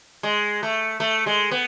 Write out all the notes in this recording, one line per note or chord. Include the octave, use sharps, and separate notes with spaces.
G#3
A3
A3
G#3
B3